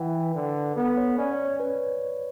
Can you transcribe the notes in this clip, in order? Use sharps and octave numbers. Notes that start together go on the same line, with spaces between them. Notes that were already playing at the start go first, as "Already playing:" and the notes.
Already playing: E3 B4 F#5 G5
D3
B3 A4
C#5
C#4 D5
C#5
C#5
B4